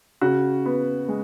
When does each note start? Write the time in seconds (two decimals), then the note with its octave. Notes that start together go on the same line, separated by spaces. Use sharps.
0.21 C#3 F#4
0.66 B3
1.08 G#3